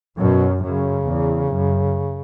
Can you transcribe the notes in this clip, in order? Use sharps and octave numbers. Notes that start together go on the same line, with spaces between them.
F#2 B2
F#2 C#3
E2
F#2